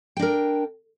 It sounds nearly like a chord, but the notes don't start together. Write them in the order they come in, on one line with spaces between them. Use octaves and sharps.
G5 D4 A#4